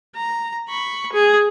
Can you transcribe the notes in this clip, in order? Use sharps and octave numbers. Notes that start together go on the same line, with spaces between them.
A#5
B5 C#6
G#4